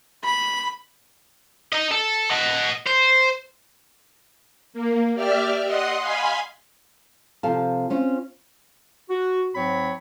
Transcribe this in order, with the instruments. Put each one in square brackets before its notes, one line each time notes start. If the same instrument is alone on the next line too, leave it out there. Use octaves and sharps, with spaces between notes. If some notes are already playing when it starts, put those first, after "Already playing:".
[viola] B5
[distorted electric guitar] D#4 D#5
A4
D#5 F#5
C5
[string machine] A#3
G4 D5 E5 F6
D#5 F#5 C6 D#6
F5 G#5 B5 C6
[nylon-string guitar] C3 F3 A4 F5 A5
C4 C#4 F4
[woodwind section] F#4
G#2 F#3 C4 C#5 B5